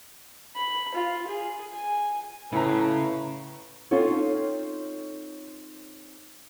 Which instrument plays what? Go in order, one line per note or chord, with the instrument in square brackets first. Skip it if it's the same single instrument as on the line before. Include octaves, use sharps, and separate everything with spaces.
[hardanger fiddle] B5
F4
G#4
G#5
[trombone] A2 [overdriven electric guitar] C#3 [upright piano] E4 A#5 [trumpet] B4
[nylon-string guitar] C4 C#4 D#4 F4 A4 C#5